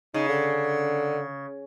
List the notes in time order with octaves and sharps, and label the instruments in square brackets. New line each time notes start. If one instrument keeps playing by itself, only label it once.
[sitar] C#3 [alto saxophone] D#4
[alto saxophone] D3